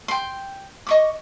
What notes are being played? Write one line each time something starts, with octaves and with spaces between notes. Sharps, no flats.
G5 C6
D#5 C#6 D6